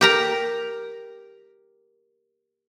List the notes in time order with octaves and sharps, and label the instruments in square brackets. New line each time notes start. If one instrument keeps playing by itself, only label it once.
[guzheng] G4 A#4 A#5